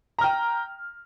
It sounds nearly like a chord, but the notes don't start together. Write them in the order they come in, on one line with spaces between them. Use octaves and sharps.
A#5 F6 G5